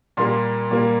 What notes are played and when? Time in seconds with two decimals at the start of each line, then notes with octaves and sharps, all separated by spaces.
0.17 A#2 G3 A#3 C6
0.71 A#2 G3 A#3